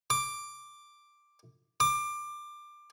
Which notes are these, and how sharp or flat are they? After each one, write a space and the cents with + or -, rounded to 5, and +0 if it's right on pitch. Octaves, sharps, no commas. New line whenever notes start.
D6 +5
D6 +20